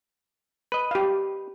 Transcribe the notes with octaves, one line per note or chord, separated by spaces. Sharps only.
B4 D#5
G4 F5